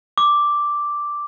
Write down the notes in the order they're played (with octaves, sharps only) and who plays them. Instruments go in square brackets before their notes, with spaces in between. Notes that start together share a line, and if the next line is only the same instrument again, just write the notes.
[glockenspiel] D6